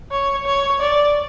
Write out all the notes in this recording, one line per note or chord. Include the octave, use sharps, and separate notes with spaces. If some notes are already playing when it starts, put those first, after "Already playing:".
C#5
C#5
D5